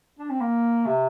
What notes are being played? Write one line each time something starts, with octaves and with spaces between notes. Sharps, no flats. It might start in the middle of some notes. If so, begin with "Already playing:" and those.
D4
C4
A#3
C3